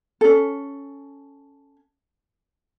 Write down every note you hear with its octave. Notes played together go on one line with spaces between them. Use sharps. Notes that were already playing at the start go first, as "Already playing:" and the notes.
C#4 A4